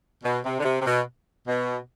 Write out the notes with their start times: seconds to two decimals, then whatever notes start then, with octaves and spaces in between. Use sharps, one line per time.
0.24 B2
0.45 C3
0.60 D3
0.64 C3
0.81 C3
0.86 B2
1.48 B2